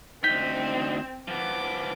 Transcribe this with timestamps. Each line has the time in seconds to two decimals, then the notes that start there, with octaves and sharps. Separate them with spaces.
0.24 D2 C4 D#4 G6 B6
1.28 F3 B3 D6